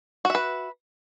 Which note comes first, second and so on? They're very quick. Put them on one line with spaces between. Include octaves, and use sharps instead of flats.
F#4 E5 B4